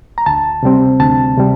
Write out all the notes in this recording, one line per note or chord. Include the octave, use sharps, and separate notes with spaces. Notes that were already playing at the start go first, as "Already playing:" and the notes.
A#5
D2 A5
C3 G3 C4
D2 A5
C3 G3